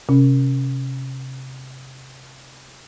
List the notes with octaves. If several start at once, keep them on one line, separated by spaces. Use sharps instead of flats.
C3 C#4